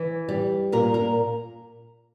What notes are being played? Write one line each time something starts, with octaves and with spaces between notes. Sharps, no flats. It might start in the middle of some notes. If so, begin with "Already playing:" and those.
Already playing: E3
G3
A#2 A#4
A#4